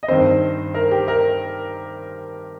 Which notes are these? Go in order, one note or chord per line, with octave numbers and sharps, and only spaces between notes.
D#5
G2 D#3 C4 C5
A#4
G4
A#4